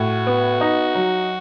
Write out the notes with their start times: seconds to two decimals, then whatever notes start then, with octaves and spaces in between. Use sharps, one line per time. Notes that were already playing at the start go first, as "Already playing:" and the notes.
Already playing: A2 F#4
0.27 B3
0.61 D#4
0.95 F#3